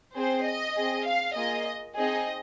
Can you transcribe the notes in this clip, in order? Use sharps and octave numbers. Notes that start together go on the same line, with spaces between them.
C4 G#4 C5
D#5
C4 G#4
F5
A#3 F4 G#4 D#5
C4 D#4 G#4 D#5